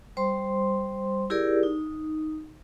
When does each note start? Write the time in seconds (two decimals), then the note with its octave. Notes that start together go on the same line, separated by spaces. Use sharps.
0.17 G3 C5 C6
1.30 E4 G4 G#4 A#4 D5
1.63 D#4